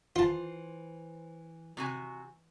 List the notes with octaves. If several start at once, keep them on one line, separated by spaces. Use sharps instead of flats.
E3 F4 C5 A5
C3 F#4 G#5